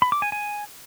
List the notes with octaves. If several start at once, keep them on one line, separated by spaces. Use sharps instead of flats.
B5
D6
G#5
G#5